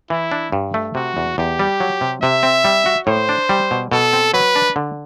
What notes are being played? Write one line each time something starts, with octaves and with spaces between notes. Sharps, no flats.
E3 E4
D4
G2
A3
C3 F#4
E2
E2 G4
G3
F#3
C3
C3 E5
C4
G3
F#4
A2 C5
D4
G3
B2
B2 A4
C4
F#3 B4
D4
D3